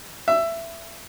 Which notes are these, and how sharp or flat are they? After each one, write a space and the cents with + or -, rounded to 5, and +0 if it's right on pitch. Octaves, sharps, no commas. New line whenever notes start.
E5 +15